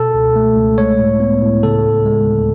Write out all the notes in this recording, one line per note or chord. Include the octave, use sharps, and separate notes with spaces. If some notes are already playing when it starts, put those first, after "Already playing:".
Already playing: B2 A4
C#2
A3
C#2
G#3 C#5
A2
B3
A2
C#3 A4
D2
G#3
D2